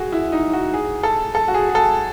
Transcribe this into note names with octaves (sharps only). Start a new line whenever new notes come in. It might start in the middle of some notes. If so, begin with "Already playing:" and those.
Already playing: F#4 G#4
E4
D#4
F#4
G#4
A4
A4
F#4
G#4
G#4
A4